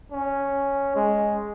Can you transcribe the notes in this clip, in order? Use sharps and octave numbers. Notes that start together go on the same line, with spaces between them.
C#4
G#3